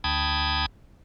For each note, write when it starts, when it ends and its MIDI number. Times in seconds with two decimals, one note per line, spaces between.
0.04 0.66 38
0.04 0.66 79
0.04 0.66 81
0.04 0.66 83
0.04 0.66 87
0.04 0.66 92